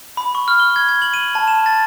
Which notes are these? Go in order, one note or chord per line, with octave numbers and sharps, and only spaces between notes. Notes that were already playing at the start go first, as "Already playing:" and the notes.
B5
C#6
F6
G7
G#6
G#6
F#7
D#7
A5
E7
A6